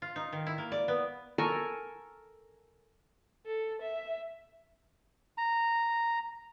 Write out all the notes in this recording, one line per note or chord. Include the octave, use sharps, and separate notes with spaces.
F4
D#4
D#3
E4
A#3
D5
B3
A4 A#4 G#5 C#6
A4
E5
A#5